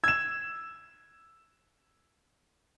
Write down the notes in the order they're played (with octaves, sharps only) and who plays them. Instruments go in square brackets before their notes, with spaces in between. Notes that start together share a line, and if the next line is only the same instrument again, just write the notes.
[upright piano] E6 E7 [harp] G#6